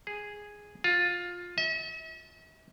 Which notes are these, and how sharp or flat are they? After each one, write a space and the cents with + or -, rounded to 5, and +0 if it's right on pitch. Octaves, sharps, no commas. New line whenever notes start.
G#4 -5
F4 +15
E5 -45